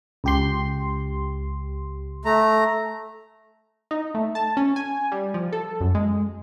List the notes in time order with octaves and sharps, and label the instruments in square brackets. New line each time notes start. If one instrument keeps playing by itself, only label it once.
[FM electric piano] C#2 G4 C6
[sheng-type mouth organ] A3 A#5
[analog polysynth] D#4
A3
A5
C#4
G#5
G3
F3
A4
F#2
G#3